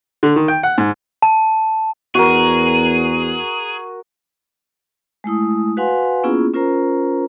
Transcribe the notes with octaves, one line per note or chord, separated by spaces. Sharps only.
D3
D#3
G5
F#5
G#2
A5
E2 F#4 G#4 A#4
G#3 A3 E4 D#6
F#4 B4 F5 F#5 G#5 C6
A#3 B3 C#4 E4 F4 G#4
C#4 F4 A#4 C5 A#5